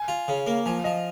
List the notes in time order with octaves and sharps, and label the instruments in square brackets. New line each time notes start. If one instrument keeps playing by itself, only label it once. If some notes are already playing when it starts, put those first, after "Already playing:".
Already playing: [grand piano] G#5
[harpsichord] F4
C#3
A#3
[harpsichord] F3 [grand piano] G#5
[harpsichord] F3 [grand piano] D#5